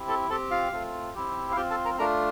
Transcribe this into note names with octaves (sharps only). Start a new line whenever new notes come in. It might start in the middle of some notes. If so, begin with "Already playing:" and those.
Already playing: C4 E4 G4
A4 A5
C4 G4 A4 A5
F4 F5
A3 C4 F4
C4 E4 G4
F5
C4 F4 G4 G5
A4 A5
A#4 A#5
A3 D4 F4 A#4 A#5